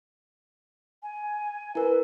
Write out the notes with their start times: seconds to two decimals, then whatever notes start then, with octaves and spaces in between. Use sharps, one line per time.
1.03 G#5
1.75 E4 A#4 B4